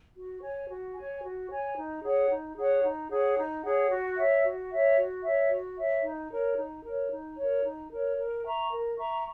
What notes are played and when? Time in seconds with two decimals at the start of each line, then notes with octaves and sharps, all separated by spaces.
0.16 F#4
0.43 C#5 G#5
0.70 F#4
0.97 C#5 G#5
1.23 F#4
1.50 C#5 G#5
1.76 D#4
2.04 G#4 C#5 F#5
2.30 D#4
2.56 G#4 C#5 F#5
2.83 D#4
3.10 G#4 C#5 F#5
3.37 D#4
3.64 G#4 C#5 F#5
3.90 F#4
4.17 C#5 E5
4.44 F#4
4.70 C#5 E5
4.97 F#4
5.24 C#5 E5
5.51 F#4
5.77 C#5 E5
6.04 D#4
6.31 A#4 C#5
6.57 D#4
6.84 A#4 C#5
7.11 D#4
7.37 C#5
7.42 A#4
7.64 D#4
7.91 A#4 C#5
8.17 A#4
8.45 E5 A#5 C#6
8.71 A#4
8.98 E5 A#5 C#6